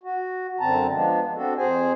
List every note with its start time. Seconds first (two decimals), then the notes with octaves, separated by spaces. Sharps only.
0.03 F#4
0.60 F#2 D3 C4 A5 A#5
0.92 F3 G#3 B3 D4
1.35 C4 D4 F#4 A4
1.57 F2 G#4 C5 G#5